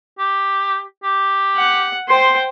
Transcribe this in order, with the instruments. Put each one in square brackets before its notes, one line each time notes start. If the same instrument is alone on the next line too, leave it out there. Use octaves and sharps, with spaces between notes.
[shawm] G4
G4
[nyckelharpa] F#5
[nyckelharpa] C5 G5 [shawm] C6